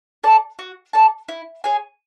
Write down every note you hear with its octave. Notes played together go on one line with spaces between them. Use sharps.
A4 D5 A5
F#4
A4 D5 A5
E4
G#4 C#5 G#5